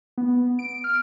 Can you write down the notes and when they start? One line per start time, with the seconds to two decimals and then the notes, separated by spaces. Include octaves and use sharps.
0.18 B3
0.59 D7
0.84 F6